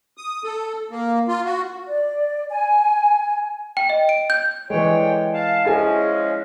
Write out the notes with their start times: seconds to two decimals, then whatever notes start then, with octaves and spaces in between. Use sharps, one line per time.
0.17 D#6
0.44 A4
0.91 A#3
1.28 F4
1.45 F#4
1.88 D5
2.50 G#5
3.77 G5
3.90 D#5
4.09 D7
4.30 G6
4.70 D3 E3 G#3 C#5 G5
5.34 F5 A5
5.65 F3 G#3 C#4 E4 G#4 G#5